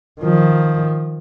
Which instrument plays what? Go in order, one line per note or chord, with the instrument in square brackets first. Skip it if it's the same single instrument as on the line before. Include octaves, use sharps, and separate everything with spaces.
[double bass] D#3 F3